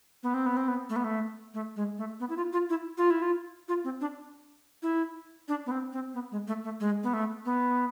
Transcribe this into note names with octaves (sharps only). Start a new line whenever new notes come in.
B3
C4
B3
C4
B3
A3
B3
A3
A3
G#3
A3
B3
E4
F4
F4
E4
F4
E4
F4
F4
C4
D4
E4
D4
B3
C4
C4
B3
G#3
A3
A3
G#3
B3
A3
B3